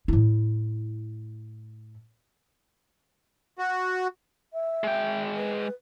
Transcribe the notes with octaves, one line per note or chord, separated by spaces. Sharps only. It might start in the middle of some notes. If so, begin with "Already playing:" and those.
A2 E4
F#4
E5
G#3 G5
B4